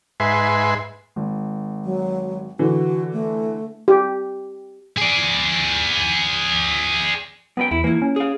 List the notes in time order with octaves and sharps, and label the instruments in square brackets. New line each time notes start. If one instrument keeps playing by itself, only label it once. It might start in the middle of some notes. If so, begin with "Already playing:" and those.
[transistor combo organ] G#2 B4 E5 G#5 C6
[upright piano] G#1
[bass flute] F#3
[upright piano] D3 E3 [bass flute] F#4
[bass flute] A3
[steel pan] G4
[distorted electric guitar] G#4 D5
[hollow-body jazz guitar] F#2 B4 G5 [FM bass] B3
[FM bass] E2 [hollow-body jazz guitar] E4
[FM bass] E3 [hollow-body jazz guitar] A#3 E4
[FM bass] C#4
[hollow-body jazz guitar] G#4 F5